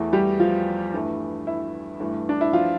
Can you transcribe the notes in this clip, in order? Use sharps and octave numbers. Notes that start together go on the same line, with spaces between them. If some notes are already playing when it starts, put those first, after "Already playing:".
Already playing: E2 E3 A3
G3 G4
F3 F4
G2 E3 A3
E4
G2 E3 A3
D4
E4
F3 F4